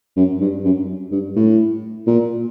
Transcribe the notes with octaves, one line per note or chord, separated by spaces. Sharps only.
F#2
G2
F#2
G2
A2
A#2